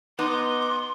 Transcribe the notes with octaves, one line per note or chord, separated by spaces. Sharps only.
B3 D#4 C6 D6